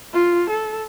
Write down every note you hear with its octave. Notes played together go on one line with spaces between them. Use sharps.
F4
A4